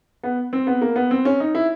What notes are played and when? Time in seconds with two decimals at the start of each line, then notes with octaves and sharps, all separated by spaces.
0.24 B3
0.53 C4
0.67 B3
0.81 A#3
0.96 B3
1.11 C4
1.25 C#4
1.40 D#4
1.55 E4